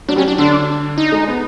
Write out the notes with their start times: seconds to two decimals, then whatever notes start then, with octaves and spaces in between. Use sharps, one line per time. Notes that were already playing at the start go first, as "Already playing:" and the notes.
0.08 F#3 D4
0.16 G3 C#4
0.23 F#3
0.28 D4
0.38 D3 D4
0.98 D#4
1.12 G#3
1.28 B3